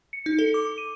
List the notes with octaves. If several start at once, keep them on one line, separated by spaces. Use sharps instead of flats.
C#7
D#4
A4
D6
D#7